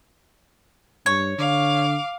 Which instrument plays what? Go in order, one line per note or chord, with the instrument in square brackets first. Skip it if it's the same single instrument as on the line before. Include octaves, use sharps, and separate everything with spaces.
[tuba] G2 [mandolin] C#5
[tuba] D3 [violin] F5 D6